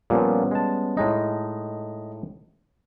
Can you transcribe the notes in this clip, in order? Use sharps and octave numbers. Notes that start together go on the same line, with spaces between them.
A#2 F3 G3 B3 C#4
G#3 A5
A2 G#3 D#4 D#5